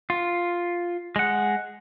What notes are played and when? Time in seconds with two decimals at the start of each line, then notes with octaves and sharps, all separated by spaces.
0.10 F4
1.16 G#3 F#5